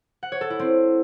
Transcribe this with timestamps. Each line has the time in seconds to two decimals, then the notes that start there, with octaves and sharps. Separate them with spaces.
0.23 F#5
0.32 C#5
0.41 A4
0.50 E4
0.59 C4